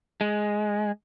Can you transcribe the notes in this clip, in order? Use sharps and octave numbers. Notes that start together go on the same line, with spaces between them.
G#3